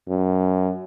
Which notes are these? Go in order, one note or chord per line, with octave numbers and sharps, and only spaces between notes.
F#2